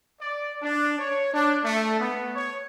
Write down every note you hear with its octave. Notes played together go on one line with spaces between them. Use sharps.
D5
D4
C#5
D4
A3
B3
C#5